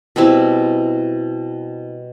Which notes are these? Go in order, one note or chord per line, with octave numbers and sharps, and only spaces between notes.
B2 G3 C4 E4